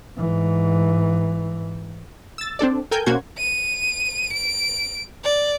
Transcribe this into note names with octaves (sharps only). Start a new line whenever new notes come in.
G#2 E3
E6 A6
C4 D4 A4 D5
A4 A#4 G5 G#5 G6
B2 A#3 C#4 F#4 C5 G#6
D#7
D7
D5